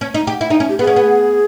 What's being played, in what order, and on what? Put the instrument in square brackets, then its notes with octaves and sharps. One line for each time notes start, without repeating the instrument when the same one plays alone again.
[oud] C#4
D#4
G4
E4
D#4
C#4
[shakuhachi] G4
[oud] B3 [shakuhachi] G#4
[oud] C#4
B3